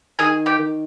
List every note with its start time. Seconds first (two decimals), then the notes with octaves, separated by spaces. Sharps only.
0.19 D#3 G#4 G#5
0.46 G4 G5
0.59 D#3